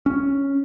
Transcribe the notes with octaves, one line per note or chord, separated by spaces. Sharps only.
C#4